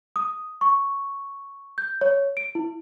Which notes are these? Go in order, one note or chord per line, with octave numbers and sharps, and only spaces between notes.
D#6
C#6
G6
C#5
D7
E4